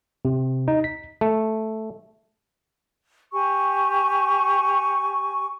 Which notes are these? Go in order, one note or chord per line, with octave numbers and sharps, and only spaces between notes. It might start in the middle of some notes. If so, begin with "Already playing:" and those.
C3
D#4
B6
A3
G4 G#5 C#6